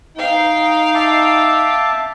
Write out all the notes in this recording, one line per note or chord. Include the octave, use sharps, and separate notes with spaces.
D#4 F5 G5
E5 A5 D6